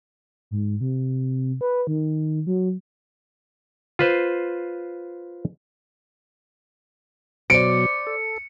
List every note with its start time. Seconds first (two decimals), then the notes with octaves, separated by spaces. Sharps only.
0.51 G#2
0.81 C3
1.61 B4
1.87 D#3
2.47 F#3
3.99 F4 B4 C5
7.50 B2 F#3 C5 D5 C#7 D7
8.07 A4